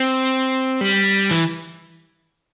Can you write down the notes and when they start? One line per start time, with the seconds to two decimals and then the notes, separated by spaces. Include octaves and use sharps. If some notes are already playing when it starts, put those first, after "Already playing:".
Already playing: C4
0.81 G3
1.31 E3